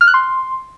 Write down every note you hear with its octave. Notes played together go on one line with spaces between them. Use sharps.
F6
F#6
C6